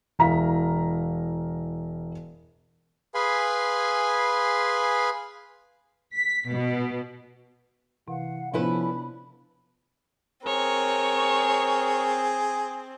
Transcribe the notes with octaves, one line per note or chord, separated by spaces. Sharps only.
E1 E4 F5 A#5 B6
G#4 B4 F5 G#5 B5 C6
B6
B2
C3 E3 F5 F#5
C3 F3 B3 C#4 D4 E4 B4 B5
C4 G#4 A#4 C#5 C#6